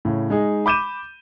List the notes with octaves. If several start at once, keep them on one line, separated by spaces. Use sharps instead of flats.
A2 C#3
G#3 D#4 G#4
B5 D6 G6 D#7 E7